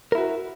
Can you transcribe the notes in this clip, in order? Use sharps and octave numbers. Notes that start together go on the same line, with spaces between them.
E4 F#4 A#4